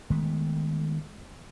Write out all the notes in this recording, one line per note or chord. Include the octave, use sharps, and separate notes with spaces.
D#3 G#3 A3 B3